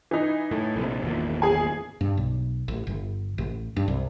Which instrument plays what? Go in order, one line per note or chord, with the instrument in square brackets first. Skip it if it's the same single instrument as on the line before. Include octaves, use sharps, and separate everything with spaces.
[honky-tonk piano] E3 D#4
[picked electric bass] A2
A#1 C3
G#1 E2 A#2
[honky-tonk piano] G#4 G#5
[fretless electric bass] G2
B1
A1
G1
A1
G2
C2